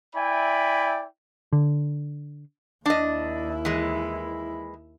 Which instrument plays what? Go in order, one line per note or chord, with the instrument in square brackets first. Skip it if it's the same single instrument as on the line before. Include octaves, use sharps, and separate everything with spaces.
[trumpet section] E4 D5 E5 G5 G#5 B5
[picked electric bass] D3
[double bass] D#2 E4 [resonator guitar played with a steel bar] D4 D#5
[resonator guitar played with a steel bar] E3 G#3